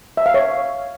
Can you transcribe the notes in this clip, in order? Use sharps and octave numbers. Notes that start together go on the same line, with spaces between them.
E5
F5
C#5